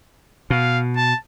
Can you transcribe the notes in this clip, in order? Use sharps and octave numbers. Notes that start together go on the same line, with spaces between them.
B2 F5
A5